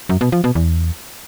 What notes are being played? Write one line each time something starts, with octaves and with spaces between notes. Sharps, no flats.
F#2
B2
F3
B2
E2